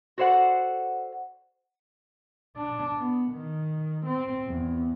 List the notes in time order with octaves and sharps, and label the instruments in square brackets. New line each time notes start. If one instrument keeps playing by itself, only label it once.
[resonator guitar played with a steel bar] F#4 A4 C5 D5 F#5
[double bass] D4
B3
D#3
C4
E2